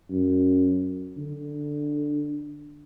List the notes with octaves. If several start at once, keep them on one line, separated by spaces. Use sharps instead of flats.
F#2
D3